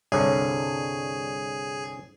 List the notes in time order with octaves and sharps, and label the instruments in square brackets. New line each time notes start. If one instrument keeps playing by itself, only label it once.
[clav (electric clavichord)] C2 G2 D3 [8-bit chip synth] G#4 [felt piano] C#5